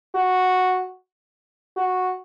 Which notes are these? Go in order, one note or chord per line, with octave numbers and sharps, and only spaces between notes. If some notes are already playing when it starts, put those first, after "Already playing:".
F#4
F#4